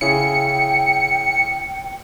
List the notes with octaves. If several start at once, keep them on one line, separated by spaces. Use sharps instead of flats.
C#3 E4 G#4 G5 C#7